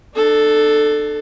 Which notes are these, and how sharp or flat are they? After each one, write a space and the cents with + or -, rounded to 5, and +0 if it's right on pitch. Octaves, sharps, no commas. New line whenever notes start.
D4 +35 A4 +0